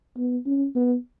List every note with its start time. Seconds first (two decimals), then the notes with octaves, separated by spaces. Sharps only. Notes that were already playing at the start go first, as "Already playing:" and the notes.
0.17 B3
0.46 C#4
0.75 B3